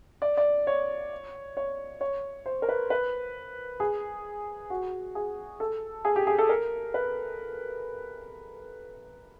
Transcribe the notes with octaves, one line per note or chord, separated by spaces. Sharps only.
D5
D5
C#5
C#5
C#5
C5
A#4
B4
B4
G#4
F#4
G#4
A4
G#4
G4
G#4
A4
A#4
B4